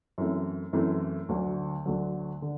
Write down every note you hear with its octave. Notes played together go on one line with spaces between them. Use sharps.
F#2 E3 A3 C4
F#2 E3 A3 C4
D2 D3 F#3
D2 D3 F#3
D3